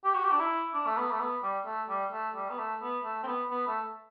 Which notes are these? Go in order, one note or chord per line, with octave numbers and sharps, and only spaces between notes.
G4
F#4
G4
D4
E4
D4
A3
B3
A3
B3
G3
A3
G3
A3
G3
B3
A3
B3
A3
C4
B3
B3
A3